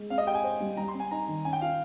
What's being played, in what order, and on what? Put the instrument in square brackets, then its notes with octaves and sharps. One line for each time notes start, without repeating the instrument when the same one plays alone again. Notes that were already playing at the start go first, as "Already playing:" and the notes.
Already playing: [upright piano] G#3
[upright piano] C4 [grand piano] F5
[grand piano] D#5
[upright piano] G4 [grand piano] G5
[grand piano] G#5
[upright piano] C5
G3
[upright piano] G3 [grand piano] A#5
[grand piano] C6
[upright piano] C4
[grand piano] G#5
[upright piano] D#4 [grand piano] A#5
[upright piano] D#3
[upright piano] C#4 [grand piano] G#5
[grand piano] G5
[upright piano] F4 [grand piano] F5